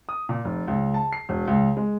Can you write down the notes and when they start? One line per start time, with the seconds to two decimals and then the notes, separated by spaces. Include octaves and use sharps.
0.09 D#6
0.29 A#2
0.45 F1
0.68 C#2
0.94 A5
1.13 C7
1.29 E1
1.48 C#2
1.77 G#3